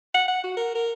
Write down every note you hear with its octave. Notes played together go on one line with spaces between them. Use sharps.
F#5
F#5
F#4
A#4
A#4